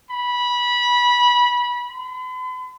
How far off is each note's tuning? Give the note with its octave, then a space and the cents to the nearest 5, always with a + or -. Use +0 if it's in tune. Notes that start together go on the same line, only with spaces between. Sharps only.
B5 -20
B5 +45